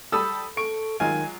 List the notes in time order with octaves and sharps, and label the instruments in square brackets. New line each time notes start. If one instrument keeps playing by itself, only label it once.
[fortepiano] G3 A4 [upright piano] B5 D#6 E6
[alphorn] A4 [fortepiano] C#6 [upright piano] D7
[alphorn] D#3 [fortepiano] F#3 G#3 F4 [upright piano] G#5